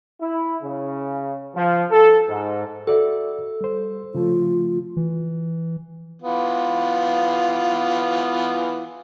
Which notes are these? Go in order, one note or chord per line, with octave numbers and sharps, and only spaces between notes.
E4
C#3
F3
A4
G#2
F#4 A4 D5 E5
G3 C5
C#3 F3 A3 F4
E3
E3 B3 F4